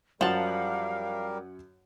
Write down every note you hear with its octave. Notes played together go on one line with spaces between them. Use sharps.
F#2 F3 G3 G4 A#4 F5 F#5 A5